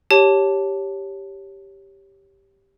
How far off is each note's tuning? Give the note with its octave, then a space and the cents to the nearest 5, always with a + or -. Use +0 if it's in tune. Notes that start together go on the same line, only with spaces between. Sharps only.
G4 +0 C#5 +0 A5 +0